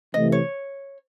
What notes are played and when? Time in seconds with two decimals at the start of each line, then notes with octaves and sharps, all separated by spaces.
0.14 C3 E3 A3 D#5
0.32 C#5